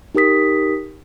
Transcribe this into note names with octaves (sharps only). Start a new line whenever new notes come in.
D#4 G4 A#4 D#6 B6